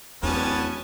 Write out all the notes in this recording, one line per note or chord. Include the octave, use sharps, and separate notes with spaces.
D1 E2 G3 B3 C#4 G#5 A5